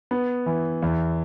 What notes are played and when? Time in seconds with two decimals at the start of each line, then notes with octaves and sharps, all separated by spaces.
0.11 B3
0.46 E3
0.82 E2